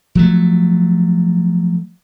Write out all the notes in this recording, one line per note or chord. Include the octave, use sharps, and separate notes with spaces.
F3 F#3 A3